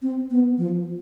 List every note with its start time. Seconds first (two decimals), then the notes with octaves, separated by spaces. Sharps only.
0.02 C4
0.31 B3
0.58 F3